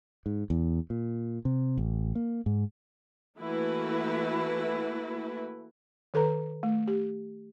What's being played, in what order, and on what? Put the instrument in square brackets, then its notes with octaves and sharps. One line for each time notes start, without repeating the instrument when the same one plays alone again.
[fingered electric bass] G#2
E2
A#2
C3
A1
A#3
G#2
[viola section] E3 A3 A#3 E4 F#4 B4
[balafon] D#3 A4 B4 A#5
A3
G4